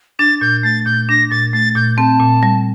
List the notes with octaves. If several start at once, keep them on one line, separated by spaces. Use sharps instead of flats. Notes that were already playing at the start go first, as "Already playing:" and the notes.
D4 A6
A#2 G6
A3 A6
A#2 G6
D4 A#6
A#2 A6
A3 A6
A#2 G6
C4 A5
A#2
G3